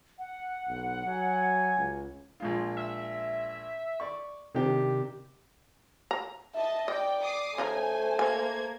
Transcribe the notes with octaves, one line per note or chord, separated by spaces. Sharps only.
F#5
B1
F#3 G#5
C#2
A#1 G#3 F4
E5
D5 C#6
C3 D#3 D4 G4
A#5
D#5 E5 A5
D5 D#5 G5
D6 D#6 C7
C#3 A3 D#4 C5 G#5 A#5
A#3 G#5 G#6